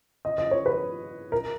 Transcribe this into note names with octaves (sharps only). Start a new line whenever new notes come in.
D#5
D#5
C#5
B4
A#4